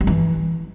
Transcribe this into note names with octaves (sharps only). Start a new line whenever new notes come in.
G3
E3